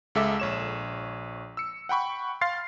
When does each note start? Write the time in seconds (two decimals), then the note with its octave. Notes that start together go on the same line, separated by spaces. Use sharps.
0.15 C#2 G#3 A4 E5 A5 D6
0.40 A#1 C#5 E7
1.57 E6 C#7
1.89 F#5 G5 B5 C#6
2.41 F5 C6 A6 C7